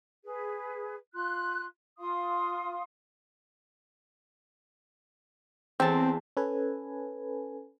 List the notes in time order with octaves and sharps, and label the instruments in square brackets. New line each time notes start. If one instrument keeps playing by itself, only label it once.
[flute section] G#4 B4
F4 C6 F#6
F4 F5 C6 D#6
[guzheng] E2 A5 [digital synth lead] C4
[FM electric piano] C#4 A4 B4 G#5